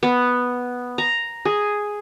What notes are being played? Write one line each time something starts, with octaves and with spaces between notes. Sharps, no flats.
B3
A#5
G#4